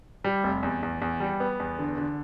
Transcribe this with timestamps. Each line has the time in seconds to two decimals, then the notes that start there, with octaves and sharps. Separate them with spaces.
0.24 G3
0.44 F1
0.63 E2
0.83 E2
1.02 E2
1.20 G3
1.40 B3
1.60 E2
1.79 D3
1.98 D3